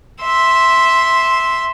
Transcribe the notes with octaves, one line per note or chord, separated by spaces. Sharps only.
E5 C6